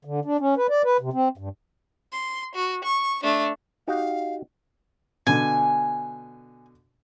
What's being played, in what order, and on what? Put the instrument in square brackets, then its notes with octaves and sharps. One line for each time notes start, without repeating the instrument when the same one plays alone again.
[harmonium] D3
D4
C#4
B4
D5
B4
C3
C4
G2
[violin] C6
F#4
C#6
A3 D4
[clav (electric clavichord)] D#4 F#4 G4 [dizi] F5
[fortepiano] B2 D3 [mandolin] G#5